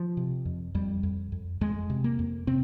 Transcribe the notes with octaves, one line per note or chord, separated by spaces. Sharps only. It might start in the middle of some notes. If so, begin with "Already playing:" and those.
Already playing: F3
C3
F2
F2 G3
F2
F2
F2 G#3
C3
A#3
F2
C3 C4